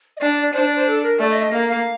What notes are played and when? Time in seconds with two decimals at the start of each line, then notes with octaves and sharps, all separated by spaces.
0.17 D#5
0.20 D4 D5
0.43 D5
0.53 D4 C5
0.65 D5
0.76 C5
0.87 A4
1.03 A#4
1.19 A3 D5
1.30 D#5
1.41 D#5
1.52 A#3 F5
1.69 F5